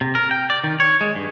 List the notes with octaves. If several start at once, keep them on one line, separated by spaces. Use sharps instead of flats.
C3
A#4
G5
D5
D#3
C#5
G#3
G2